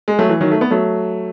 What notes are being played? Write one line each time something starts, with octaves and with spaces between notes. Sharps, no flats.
G#3
F#3 A3
E3
D#3 F#3
A3
B3
F#3 A3